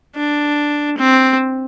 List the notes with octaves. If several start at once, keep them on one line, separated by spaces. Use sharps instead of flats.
D4
C4